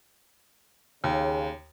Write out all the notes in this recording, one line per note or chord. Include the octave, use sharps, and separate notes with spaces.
D#2 C#3